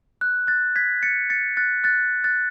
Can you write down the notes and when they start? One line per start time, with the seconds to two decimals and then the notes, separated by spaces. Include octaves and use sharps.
0.21 F#6
0.47 F#6 A6
0.76 G#6 B6
1.03 A6 C#7
1.30 A6 C#7
1.57 F#6 A6
1.84 F#6 A6
2.24 F#6 A6